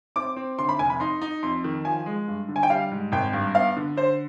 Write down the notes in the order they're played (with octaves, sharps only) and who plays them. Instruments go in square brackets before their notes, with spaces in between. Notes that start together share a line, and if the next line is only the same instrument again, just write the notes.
[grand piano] C4 [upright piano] D6
[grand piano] C4
[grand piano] D3 [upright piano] C6
[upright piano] B5
[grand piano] F1 [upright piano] G#5
[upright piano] B5
[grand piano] D#4 [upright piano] C6
[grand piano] D#4
[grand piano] F2 [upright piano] C6
[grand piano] D#3
[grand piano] F3 [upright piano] G#5
[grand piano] G#3
G2
D3
[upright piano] G#5
G5
[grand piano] G3 [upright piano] F5
[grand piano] G#2
[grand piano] G#1 [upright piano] G5
[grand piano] G2
[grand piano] B3 [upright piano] F5
[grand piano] D3
[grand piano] D3 [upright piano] C5